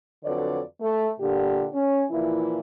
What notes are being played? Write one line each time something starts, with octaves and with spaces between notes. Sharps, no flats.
F2 D3 F#3 B4 C#5 D5
A3
A#2 D3 G4
C#4
A#2 E3 F3 E4